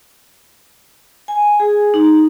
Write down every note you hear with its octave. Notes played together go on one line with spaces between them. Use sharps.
G#5
G#4
D#4